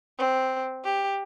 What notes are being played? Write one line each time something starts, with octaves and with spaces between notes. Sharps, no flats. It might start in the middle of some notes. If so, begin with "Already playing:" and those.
C4
G4